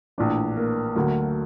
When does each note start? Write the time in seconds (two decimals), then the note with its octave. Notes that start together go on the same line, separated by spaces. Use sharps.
0.18 A#1 A2 E3 D4 D5
0.57 A#3 A#4
0.95 D2 D3 F#3 A3 A#3 A#4